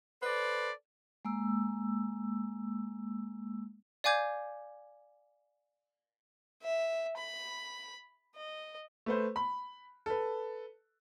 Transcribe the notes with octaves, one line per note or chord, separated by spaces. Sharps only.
A4 B4 C5 D5
G#3 A#3 E6
D5 F5 G#5 D6 G6 G#6
E5
B5
D#5
A3 B4 C5
B5
A4 B4